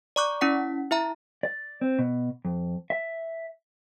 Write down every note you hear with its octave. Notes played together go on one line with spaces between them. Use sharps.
D5 A#5 C#6 D6 F#6
C#4 E4 F#5 B6
E4 E5 A#5
D5
C4
B2
F2
E5